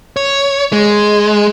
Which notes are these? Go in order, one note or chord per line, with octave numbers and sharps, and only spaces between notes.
C#5
G#3